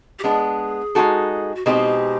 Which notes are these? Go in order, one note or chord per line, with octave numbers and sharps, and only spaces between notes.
G4
G#3 B3 D4 G#4
G#3 C4 D#4 F#4 A4
F#4
B2 G#3 C4 D#4 G4